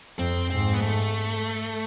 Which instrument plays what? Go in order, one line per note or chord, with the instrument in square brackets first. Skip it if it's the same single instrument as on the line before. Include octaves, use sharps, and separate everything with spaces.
[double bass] F2 [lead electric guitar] C4
[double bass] G#2 [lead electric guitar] C4
[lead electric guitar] B3
A3